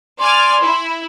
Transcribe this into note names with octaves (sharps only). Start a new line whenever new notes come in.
D5 G#5 C6 F6
E4